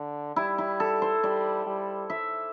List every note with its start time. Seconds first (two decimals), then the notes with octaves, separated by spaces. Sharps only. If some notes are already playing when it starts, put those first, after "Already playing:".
Already playing: D3
0.36 G3 E4
0.58 E4
0.80 A4
1.02 C5
1.24 G3 D5
1.67 G3
2.10 E5